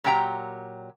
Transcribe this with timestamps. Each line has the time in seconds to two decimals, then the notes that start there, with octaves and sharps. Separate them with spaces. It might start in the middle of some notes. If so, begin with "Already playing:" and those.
0.04 A#2 F#3 G4 G5 G#5 A#5